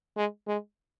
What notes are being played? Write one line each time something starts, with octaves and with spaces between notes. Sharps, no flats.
G#3
G#3